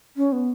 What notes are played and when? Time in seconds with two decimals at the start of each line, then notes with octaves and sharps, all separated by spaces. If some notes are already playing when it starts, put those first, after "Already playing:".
0.17 C#4
0.33 B3